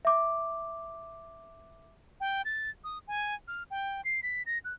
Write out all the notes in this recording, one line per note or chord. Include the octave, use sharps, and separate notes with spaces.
E5 D6
G5
A6
D#6
G#5
F6
G5
C7
B6
A#6
F#6